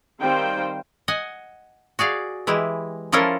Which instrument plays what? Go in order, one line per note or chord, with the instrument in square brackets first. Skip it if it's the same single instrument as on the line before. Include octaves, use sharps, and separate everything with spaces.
[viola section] D#3 G3 C4 C5 F5 G5
[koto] D#5 F#5 G#5
F#4 G#4 D5 F5
E3 G#3 E4 G4
F3 C#4 E4 F4 A4 A#4